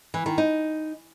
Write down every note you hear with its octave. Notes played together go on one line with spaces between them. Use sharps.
E3
D#3
D#4